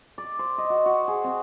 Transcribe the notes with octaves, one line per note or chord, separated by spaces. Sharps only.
D5
C5
D#5
F#4
F#4
G#4
C4